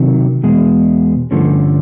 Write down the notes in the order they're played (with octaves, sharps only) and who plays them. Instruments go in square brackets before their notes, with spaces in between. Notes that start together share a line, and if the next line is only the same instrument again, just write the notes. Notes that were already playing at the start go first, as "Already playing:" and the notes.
Already playing: [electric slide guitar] C3 D#3 F#3
E2 B2 G#3
G2 D3 F3 A3 C#4